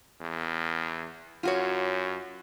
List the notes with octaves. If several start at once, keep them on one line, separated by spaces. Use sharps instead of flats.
E2
F#2 F4 F#4 C#5